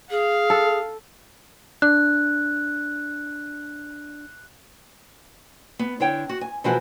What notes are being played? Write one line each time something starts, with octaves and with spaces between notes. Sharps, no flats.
G#4 F5
A4
D4 F#6
B3
D3 E4 C#5 G5
F#4
G#5
B2 E3 F3 G#3 F#4 A#4